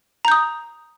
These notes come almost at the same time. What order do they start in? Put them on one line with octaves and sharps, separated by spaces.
A#5 G6 D#6